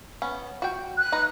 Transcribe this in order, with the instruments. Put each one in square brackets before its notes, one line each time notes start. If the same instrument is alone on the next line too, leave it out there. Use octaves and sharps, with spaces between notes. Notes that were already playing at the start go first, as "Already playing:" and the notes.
[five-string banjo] B3 C#4
F#4 G5
[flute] F#6
[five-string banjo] D#4 B4 A#5